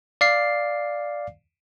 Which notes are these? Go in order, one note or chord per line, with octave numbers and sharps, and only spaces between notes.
D5 F5 C7